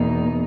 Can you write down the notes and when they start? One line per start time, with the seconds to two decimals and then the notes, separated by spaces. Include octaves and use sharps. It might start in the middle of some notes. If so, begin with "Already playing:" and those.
Already playing: E2 B2 A#3 D#4